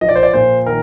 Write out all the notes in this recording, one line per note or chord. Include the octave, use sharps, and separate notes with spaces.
F3 D#5
D5
C5
D5
A#2 C5
D#3 A#4